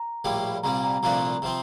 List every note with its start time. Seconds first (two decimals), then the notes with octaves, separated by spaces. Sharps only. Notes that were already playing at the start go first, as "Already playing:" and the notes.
Already playing: A#5
0.24 A#1 A2 G3 A#3
0.63 C2 A#2 G3 A#5
0.84 A#5
1.03 C2 A#2 F3 A3 D4 A#5
1.42 C3 F3 C4